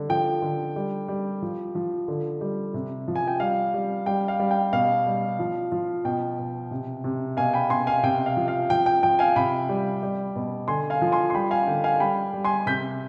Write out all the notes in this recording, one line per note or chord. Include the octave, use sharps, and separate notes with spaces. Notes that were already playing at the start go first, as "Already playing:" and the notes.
Already playing: D3 G3
F3 G5
D3
G3
G3
F3
F3
D3
G3
C3
F3
G#5
G5
G3 F5
G3
G3 G5
F5
G3
G5
B2 F5
G3
F3
F3
B2 G5
B2
C3
C3
B2 F5 G#5
G5 B5
B2 G#5 C6
F5 G#5
C3 G5
F5
F3
F5
F3 G5
G5
F3 G5
F5 G#5
C3 G5 B5
G3
G3
B2
D3 G#5 C6
F5 G#5
F3
G#5 C6
C6
G3 G5 B5
F5 G#5
D3 G5
F5 G#5
G3 G5 B5
G3
G#5 C6
C3 G6 B6